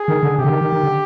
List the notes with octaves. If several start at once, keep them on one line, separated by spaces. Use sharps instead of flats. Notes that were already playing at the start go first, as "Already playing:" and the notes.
Already playing: G#4
D#3
D3
C3 G4
D3
D#3
D#3
D#3
D3